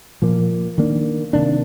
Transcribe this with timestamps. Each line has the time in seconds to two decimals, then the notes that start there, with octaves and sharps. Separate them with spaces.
0.22 A#2 F3 A#3
0.78 D#3 A#3 D4
1.33 C3 D#3 A#3 D4